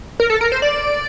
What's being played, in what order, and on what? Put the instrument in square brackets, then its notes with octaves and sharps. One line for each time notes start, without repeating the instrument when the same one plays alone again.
[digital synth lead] A#4
A4
A#4
C5
D5